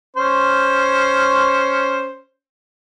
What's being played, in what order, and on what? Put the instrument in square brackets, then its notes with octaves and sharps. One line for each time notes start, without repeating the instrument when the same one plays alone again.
[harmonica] C#4 C5